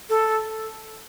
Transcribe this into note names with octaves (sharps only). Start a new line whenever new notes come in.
A4